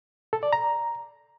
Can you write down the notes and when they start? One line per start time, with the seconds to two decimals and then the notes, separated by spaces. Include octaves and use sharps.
0.33 A4
0.43 D5
0.53 A#5